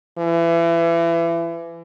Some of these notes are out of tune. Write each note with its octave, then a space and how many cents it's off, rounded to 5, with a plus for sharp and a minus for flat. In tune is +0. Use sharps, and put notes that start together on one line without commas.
E3 +30